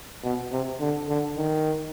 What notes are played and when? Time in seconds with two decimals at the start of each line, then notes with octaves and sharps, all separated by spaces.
0.24 B2
0.52 C3
0.80 D3
1.09 D3
1.37 D#3